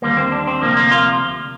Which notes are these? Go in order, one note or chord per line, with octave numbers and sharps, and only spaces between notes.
D#2 D3 G3 A#3
C4
D4
C4
D2 C3 F3 A#3
A#3
F4